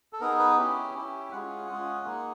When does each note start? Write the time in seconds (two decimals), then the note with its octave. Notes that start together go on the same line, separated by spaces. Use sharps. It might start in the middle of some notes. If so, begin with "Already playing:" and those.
0.13 A4
0.21 B3 D#4 G#4 A#4
0.39 B4
0.58 C#4 E4 G4
0.94 C#4 E4 G4
1.32 G#3 C#4 F4 G#4 F#5
1.69 G#3 C#4 F4 G#4
2.05 A#3 D#4 G#4